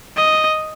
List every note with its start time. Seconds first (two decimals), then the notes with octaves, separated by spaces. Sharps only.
0.17 D#5